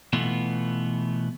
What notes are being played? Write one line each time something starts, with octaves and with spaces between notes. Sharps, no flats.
B2 E3 A3 B3 F4